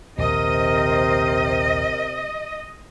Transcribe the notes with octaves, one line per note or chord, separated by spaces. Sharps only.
A#1 D#2 C3 D#3 A#4 C5 D#5